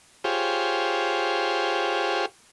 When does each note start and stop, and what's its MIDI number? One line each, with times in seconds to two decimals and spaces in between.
0.24 2.26 65
0.24 2.26 67
0.24 2.26 68
0.24 2.26 72
0.24 2.26 73